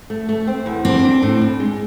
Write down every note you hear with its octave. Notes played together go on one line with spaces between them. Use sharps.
A3
A3
C4
E2
C4 D4
D4
A2
D4
G#3